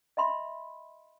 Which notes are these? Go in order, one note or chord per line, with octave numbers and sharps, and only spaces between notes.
D#5 E5 B5 C6